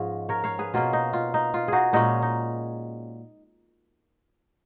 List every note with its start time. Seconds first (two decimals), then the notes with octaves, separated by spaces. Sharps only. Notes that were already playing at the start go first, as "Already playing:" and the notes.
Already playing: G#2 F3 G#3 C#4 D#5
0.29 A#4 C#5
0.44 C#5 F5
0.59 G#4 B4
0.74 B2 A#3 C#4 F4
0.93 D#4
1.13 F4
1.34 D#4
1.54 F4
1.68 D#4 F#4 G#4
1.93 A#2 G#3 C#4 D#4
2.22 D#4